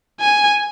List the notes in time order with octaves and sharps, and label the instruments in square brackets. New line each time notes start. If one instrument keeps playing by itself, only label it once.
[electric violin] G#5